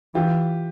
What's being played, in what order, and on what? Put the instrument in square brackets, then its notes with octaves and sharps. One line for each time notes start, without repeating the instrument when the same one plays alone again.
[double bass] E3 [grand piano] F4 G4